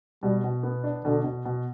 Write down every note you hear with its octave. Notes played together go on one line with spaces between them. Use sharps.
B2 G3
B2
B3
D4
B2 D3
B2
B2